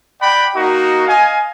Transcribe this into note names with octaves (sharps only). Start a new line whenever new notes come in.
D5 F#5 G5 B5
A#3 D#4 F#4
D#5 F5 G#5